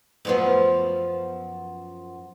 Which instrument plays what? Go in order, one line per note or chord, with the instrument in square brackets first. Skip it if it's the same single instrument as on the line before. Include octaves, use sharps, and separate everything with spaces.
[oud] F#2 F3 B3